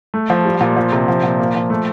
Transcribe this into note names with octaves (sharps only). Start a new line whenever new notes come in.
A3
F3
G3
A#2
F3
C3
F3
A#2
A#3
F3
A3